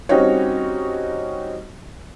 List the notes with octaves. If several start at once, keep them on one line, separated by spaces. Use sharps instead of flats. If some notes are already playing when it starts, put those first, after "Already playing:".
G3 C4 C#4 D#4 F#4 C#5